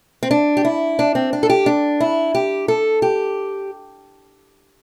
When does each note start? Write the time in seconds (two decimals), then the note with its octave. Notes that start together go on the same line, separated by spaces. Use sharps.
0.23 C4
0.31 D4
0.57 G4
0.65 E4
0.99 D4
1.15 C4
1.33 D4
1.43 A4
1.50 G4
1.66 D4
2.00 E4
2.35 G4
2.68 A4
3.02 G4